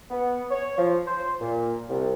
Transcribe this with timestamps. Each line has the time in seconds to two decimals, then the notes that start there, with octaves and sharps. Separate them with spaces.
0.11 B3
0.51 C#5
0.78 F3
1.07 C5
1.41 A#2
1.90 C2